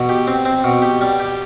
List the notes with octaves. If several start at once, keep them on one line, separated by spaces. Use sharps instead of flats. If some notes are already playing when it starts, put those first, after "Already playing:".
Already playing: B2
G4
C4
C4
B2
G4
G3
G4